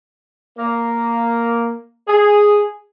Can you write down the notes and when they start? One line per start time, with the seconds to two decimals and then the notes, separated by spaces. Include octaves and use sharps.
0.58 A#3
2.08 G#4